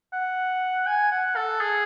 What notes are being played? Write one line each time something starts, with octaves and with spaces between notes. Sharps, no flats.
F#5
G#5
F#5
A4
G#4